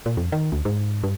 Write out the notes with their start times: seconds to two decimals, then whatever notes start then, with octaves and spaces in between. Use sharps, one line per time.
0.06 A#2
0.17 F2
0.32 D#3
0.52 D2
0.65 G#2
1.03 G2